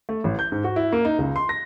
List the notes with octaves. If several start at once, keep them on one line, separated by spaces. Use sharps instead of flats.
A3
A1
G6
G#2
F#4
E4
A#3
D#4
C#2
C6
A#6